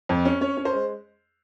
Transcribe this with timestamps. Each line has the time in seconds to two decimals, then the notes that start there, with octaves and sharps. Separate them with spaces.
0.09 F2
0.25 C#4
0.41 C#4 C#5
0.57 C#4
0.65 C5
0.73 G#3